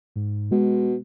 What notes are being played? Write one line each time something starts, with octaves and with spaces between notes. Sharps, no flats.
G#2
B2 G#3